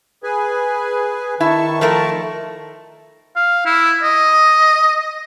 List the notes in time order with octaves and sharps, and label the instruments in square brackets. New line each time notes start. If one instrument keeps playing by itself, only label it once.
[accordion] G#4 B4 G#5
[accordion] D#3 A5 C#6 [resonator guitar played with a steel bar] E4
[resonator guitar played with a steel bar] F3 A3 A#4
[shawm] F5
E4
D#5